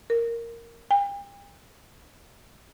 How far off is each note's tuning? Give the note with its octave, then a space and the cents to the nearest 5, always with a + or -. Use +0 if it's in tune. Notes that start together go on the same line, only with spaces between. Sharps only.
A#4 -5
G5 +45